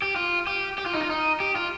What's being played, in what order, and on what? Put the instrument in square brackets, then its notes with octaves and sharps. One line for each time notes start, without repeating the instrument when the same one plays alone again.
[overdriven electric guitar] G4
F4
G4
G4
F4
D#4
F4
D#4
G4
F4